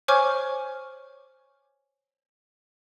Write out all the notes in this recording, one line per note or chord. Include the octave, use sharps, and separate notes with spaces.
C5 C#5 G#5 C#6 D6 F6